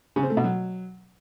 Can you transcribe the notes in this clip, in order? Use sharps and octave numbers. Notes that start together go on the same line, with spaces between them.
C#3
C4
A3
B2
F#3